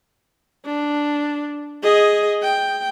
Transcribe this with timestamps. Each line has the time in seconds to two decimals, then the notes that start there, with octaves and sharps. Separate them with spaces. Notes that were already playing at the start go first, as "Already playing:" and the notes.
0.66 D4
1.83 G#4 D#5
2.43 G5